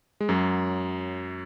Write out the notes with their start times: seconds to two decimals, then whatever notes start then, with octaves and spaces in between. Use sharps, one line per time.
0.21 G#3
0.29 F#2 F#3